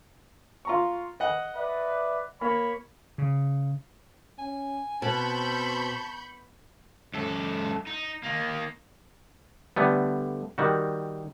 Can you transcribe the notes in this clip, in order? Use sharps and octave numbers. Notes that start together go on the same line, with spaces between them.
F4 A#5 C#6
D#5 F#5
B4 D5 E5
A#3 C#5 B5
C#3
C#4 G#5
B2 C4 A5 B5 C#6 G6
F#2 A4
D#4
D#3 A#3
D3 G3 A3 B3
D#3 G3 F#4